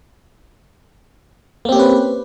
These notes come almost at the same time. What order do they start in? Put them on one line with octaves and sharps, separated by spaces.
A#3 C4 G4 C#4 B4